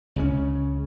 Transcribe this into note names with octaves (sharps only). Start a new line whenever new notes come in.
C#2 C#3 C#4